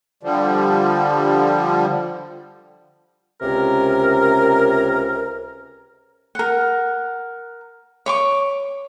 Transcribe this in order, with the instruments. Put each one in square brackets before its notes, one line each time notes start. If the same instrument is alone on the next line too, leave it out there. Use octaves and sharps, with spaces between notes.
[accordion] D3 F3 G3
[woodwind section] C#2 C3 C#4 A#4
[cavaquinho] A#4 F#5
C#5 C#6 D6